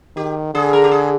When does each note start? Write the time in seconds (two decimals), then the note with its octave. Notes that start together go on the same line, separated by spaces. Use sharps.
0.16 D#3 G4
0.54 D3 G#4
0.73 A#4
0.84 G4
0.91 G#4